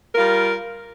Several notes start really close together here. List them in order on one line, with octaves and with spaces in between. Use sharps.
A#4 F4 G3